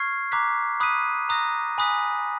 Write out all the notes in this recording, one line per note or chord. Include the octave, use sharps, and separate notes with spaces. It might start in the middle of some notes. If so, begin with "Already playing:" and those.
Already playing: C#6 F6 G#6 C7
A#5 D6 F#6 B6
B5 D#6 F#6 B6 D#7
A#5 D#6 F#6 A#6
G#5 B5 D#6 F#6 B6